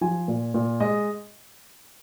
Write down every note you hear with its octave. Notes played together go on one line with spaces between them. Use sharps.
F3 G#5
A#2
A#2
G#3 D#5